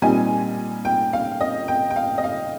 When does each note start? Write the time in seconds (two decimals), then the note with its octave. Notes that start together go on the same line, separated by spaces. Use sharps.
0.02 A#2 G3 C4 D#4 G#5
0.85 G5
1.13 F5
1.41 D#5
1.68 G5
1.90 G5
1.96 F5
2.18 D#5
2.24 F5